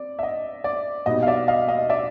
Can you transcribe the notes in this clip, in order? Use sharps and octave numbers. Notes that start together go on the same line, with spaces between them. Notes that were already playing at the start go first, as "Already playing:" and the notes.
Already playing: C4 D5
E5
D#5
D5
B2 G3 B3 D#4 D#5
F5
D5 E5
D#5 F5
D#5 F5
D5 E5